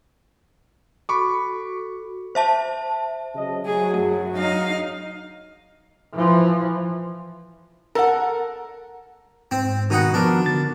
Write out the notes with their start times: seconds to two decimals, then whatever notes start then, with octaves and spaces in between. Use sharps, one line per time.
1.09 F#4 A4 B5 C#6 D6
2.35 C5 E5 A5
3.35 C#3 F#3 D#5
3.65 F#3 G#4
3.98 F#2
4.37 D#4 F5
6.14 E3 F3
7.95 A4 A#4 F#5
9.51 G#2 C4
9.90 B2 D#3 D#4 F#5
10.14 F3 B3 D4 F#4 A#4
10.46 D3 A6